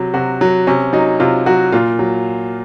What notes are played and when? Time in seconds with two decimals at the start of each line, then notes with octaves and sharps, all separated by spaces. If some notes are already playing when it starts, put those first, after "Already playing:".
Already playing: C3 F#3
0.14 C3 F#4
0.41 F#3
0.67 C3 C#4
0.93 F#3 D#4
1.20 C3 F4
1.46 F#3 F#4
1.72 A#2 F4
1.99 F#3